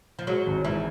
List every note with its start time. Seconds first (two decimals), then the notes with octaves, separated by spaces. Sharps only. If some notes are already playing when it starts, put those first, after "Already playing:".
0.19 F3
0.27 F#3 G#3
0.46 G#1
0.65 G#2 E3